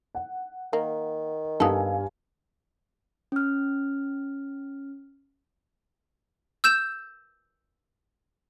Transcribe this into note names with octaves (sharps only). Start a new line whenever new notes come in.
F#5
D#3 A#3
G2 B3 D#4 A4 F5 G#5
C#4 F6
E6 G6 E7